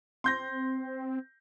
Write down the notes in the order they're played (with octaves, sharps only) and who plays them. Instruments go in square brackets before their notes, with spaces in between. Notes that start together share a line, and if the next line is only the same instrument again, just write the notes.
[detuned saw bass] C4 [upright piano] C6 G6 A#6